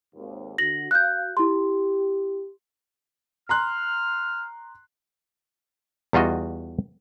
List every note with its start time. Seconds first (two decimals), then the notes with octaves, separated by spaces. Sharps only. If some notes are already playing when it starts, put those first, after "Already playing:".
0.15 G#1 D#2
0.58 D3 F#4 A#6 F#7
0.91 F#4 F5 F#6 G6
1.37 E4 G4 C6
3.49 A#5 C6 F6 F#6
6.13 E2 G3 F4 F#4 D#5